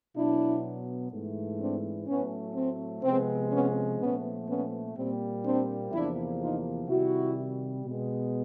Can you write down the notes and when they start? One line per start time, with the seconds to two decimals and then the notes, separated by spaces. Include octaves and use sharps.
0.15 B2 F#3 B3 D4 E4
1.11 G#2 E3 A3
1.59 C4 D4
2.07 A2 F#3 A3 B3 C#4
2.55 C4
3.03 C3 F3 G#3 B3 C4
3.51 B3 C#4
3.99 A#2 F3 A3 B3 C#4
4.48 B3 C#4
4.96 A#2 G3 A#3 C4
5.44 C4 D4
5.92 E2 C3 F3 A#3 D4 E4
6.40 D#4 F4
6.89 C3 D#3 G3 E4 F#4
7.85 B2 G#3 B3